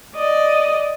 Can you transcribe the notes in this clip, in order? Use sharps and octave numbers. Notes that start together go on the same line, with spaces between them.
D5 D#5